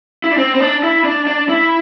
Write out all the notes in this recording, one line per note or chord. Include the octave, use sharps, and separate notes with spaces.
E4
D4
C4
C4
D4
E4
D4
D4
E4